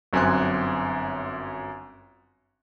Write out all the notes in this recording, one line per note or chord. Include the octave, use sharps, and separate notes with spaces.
G1 F#2 C4 G#5 C6 F#6